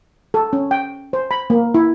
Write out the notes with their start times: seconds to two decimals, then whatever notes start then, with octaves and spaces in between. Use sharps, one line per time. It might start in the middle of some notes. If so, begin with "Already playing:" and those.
0.34 A4
0.53 C#4
0.71 G5
1.13 C5
1.31 B5
1.50 A#3
1.74 E4